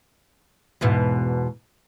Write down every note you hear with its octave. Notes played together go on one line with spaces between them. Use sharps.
E2 G#2 B2